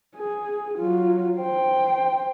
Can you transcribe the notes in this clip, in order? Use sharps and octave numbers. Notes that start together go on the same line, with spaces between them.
G#4
F#3 F4
C5 G5